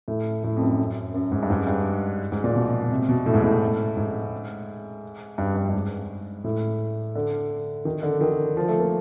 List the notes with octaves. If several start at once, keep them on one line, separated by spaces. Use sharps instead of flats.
A2
A2
F2
F#2
F#2
G#2
G2
G#2
G2
G#2
A#2
B2
C3
B2
A2
G#2
A2
G#2
G2
G2
G2
G#2
A2
D3
D#3
D3
D#3
F3
A3
A#3